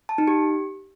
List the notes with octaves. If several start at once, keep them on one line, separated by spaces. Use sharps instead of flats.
A5
D#4
G4